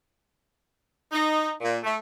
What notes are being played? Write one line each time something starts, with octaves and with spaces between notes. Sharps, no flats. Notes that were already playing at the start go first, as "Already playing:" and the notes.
D#4
A#2
A3